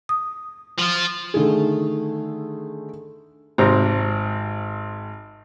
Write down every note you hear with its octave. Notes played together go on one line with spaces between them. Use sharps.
D#6
F3 F4
D3 D#3 A3 G#4
G#1 C3 C4 A#5